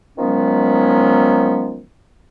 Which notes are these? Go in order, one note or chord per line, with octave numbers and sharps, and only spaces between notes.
D#3 F3 F#3 G#3 B3 C#4